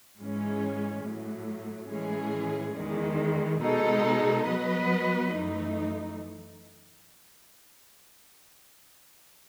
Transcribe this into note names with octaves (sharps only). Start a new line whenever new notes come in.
G#2 E3 G#3 C#4
A2 F#3 A3
A2 E3 G#3 C#4 G#4
E2 D#3 G#3
B2 G#3 D#4 A4
F#3 B3 F#4 B4 D#5
F#2 E3 A3 D#4